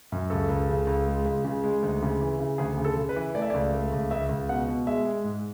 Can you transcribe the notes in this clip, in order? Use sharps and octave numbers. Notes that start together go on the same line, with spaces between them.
F#2
C#2 A4
C#2
C#3
C#2
G#3
C#2
C#3
G#3
D2
C#3
E3
C#3
D2 G#4
C#3
A4
C#3
B4
E3
A3 D5
E5
C#2 D5
A3
C#2
C#2 E5
C#2
B2 F#5
B2
G#3 E5
G#3
G#2